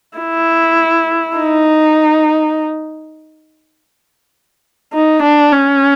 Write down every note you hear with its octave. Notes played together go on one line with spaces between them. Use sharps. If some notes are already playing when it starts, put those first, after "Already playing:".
E4
D#4
D#4
D4
C#4